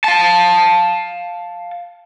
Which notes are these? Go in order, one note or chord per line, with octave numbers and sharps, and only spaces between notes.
F5 A5